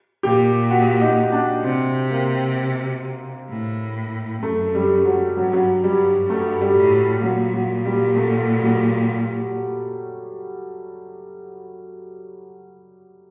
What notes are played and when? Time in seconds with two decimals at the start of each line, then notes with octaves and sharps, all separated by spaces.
0.23 A#2 G4
0.71 F#4
1.01 D#4
1.32 D4
1.64 C3 C4
2.10 A#3
3.50 A2
4.43 F#2 A3
4.75 G3
5.05 F#3
5.37 G2 F#3
5.53 F#3
5.83 G2 G3
6.30 G2 A3
6.61 G3
6.77 A2
7.22 A#2 F#3
7.54 F#3
7.85 G3
8.16 A3
8.62 F#3